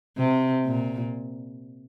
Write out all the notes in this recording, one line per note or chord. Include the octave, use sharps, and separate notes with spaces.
C3
A#2